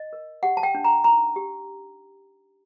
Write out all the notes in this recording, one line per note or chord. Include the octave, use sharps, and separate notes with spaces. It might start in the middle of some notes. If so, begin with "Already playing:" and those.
Already playing: D#5
A#4
G4 F#5
A5
G5
D4
A#5
D#4 A#5
G4